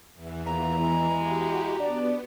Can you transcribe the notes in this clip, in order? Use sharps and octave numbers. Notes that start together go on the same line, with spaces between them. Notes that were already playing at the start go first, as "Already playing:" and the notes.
E2 E3
A#2 B3 A#5
G#3 E4
F#4 G4
B3 D4 D5